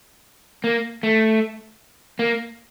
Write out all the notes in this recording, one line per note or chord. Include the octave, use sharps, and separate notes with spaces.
A#3
A3
A#3